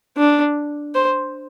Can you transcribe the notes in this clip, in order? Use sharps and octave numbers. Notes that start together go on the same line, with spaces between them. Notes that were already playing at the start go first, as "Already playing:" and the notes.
D4
C5